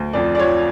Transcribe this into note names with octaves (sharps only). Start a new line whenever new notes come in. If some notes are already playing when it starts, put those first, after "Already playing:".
Already playing: D2
F2 D5
D5
F3 C#5